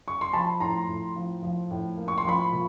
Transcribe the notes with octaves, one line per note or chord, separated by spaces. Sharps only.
C#6
C6
F3 A5 B5
A2 A#5 C6
A2
F3
F3
A2
A#3
C#6
C6
F3 B5 C#6
A#2